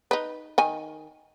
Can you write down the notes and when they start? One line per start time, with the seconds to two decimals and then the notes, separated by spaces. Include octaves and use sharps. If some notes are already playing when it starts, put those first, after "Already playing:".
0.11 D#4 B4
0.58 D#3 G#5